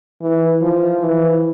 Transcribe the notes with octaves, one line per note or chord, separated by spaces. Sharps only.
E3
F3
E3